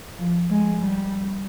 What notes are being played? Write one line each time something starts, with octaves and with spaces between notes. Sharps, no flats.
F3
G#3
G3